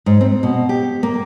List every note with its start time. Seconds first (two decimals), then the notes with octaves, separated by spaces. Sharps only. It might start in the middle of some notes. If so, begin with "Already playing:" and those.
0.06 G#2
0.21 C4
0.43 B2
0.69 G4
1.03 A#3